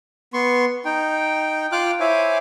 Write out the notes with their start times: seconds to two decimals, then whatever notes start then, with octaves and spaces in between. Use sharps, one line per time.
0.33 B3 C6 C#6
0.85 D#4 G5
1.72 F4 G5 D6 F6 F#6
2.00 E4 C5 C#5 E5 G#5 D6